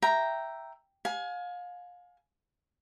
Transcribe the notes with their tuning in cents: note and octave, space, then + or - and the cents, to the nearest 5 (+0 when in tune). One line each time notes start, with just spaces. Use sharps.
E5 +0 G5 -5 A#5 +0
F5 +30 G#5 +25